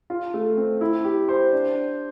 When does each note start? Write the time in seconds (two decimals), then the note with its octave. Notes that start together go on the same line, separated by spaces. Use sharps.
0.10 F4
0.34 A3
0.57 C4
0.81 E4
1.04 G4
1.29 C5
1.52 D4